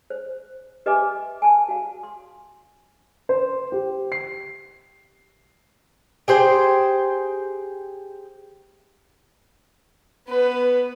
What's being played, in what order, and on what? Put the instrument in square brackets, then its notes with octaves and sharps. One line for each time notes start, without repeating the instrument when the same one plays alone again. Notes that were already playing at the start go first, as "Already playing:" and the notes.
[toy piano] C5
G4 B4 D#5 E5 G#5 D6
G#5 A5
F#4 F5
C6
[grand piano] C5
G4
C7
[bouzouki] G4 G#4 C5 G5
[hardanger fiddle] B3 B4